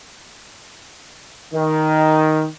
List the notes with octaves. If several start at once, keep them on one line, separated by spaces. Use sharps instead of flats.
D#3